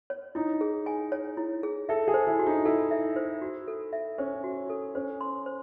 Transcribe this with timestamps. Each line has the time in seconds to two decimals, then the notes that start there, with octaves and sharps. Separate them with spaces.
0.10 C#5
0.35 D#4 E4
0.61 G#4
0.86 G#5
1.12 C#5
1.37 E4
1.63 G#4
1.89 A4 E5
2.08 G#4
2.14 C5
2.27 E4
2.39 F#4
2.46 D#4
2.65 E4 A4
2.91 E5
3.16 C5
3.42 F#4
3.68 A4
3.93 E5
4.18 C#4 C5
4.44 F#4
4.70 A4
4.95 C#4 C5
5.21 C6
5.46 C5